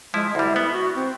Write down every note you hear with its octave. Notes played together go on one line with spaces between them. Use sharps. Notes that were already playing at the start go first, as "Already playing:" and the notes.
F3 G#3 E4
D2 G3 E4
B3
F#4
C4